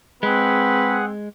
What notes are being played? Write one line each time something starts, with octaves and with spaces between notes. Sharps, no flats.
G#3 C4 G#4 B4 F#5